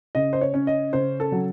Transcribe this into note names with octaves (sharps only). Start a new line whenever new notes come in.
C#3 D#5
C5
C#5
C#4
D#5
C#3 C5
A4
F#3